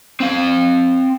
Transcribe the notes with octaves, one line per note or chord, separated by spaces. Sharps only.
C4 F5